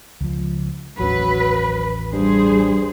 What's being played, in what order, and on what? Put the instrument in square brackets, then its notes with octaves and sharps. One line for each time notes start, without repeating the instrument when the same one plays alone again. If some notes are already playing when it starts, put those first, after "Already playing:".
[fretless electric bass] C#2 F3
[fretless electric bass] A1 D#2 C#4 [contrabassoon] F#3 [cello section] B4
[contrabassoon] G2 [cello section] G3 G#4 C5